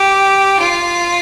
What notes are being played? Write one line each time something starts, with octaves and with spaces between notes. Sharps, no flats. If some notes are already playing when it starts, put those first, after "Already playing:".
Already playing: G4
F4